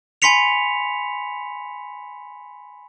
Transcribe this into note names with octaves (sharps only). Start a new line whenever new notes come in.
G#5 B5 C6 B6 C#7 F7